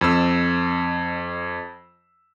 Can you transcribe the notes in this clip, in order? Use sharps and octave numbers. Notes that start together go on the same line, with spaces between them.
F2 E6